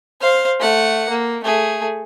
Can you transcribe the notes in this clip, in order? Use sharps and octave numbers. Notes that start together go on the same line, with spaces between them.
C5 F5
A3 F#5
A#3
A3 G#4